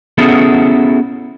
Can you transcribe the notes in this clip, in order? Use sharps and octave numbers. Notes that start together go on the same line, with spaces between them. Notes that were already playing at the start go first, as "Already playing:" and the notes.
B3 C#4 E4 F#4 G#4 A4